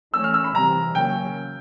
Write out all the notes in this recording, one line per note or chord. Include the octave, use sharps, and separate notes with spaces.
E3 A3 C#4 E6
F6
E6
B5
C3 E3 G3 C4 A#5
C#3 F#3 A#3 C#4 G5